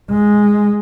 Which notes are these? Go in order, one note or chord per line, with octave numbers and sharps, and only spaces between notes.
G#3